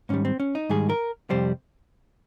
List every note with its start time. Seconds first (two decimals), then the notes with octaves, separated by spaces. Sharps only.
0.09 G#2 D#3 G3 C#4
0.25 C4
0.40 C#4
0.55 D#4
0.70 G#2 D#3 G3 G#4
0.89 A#4
1.30 F2 C3 G3 C5